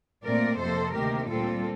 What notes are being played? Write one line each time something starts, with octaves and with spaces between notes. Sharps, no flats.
A#2 A3 C4 A#4 D5
F2 C3 F3 A#3 A4 C5
D2 C3 D#3 A#3 G4 A#4
A#2 G3 C4 F4 A4